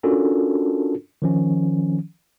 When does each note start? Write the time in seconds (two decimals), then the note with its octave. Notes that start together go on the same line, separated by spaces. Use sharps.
0.03 C#4 D4 F4 F#4 A4 A#4
1.22 D#3 F3 C#4